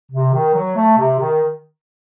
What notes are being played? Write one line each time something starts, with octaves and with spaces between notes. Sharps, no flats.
C3
D#3
F#3
A3
C3
D#3